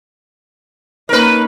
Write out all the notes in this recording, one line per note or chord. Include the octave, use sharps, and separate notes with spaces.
A#3 C#4 D#4 A#4 B4